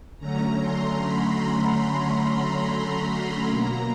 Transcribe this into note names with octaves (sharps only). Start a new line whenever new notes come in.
D3 F#3 A3 C#4 A#5
C6
B5
B5
B2 F#3 A#3 A#5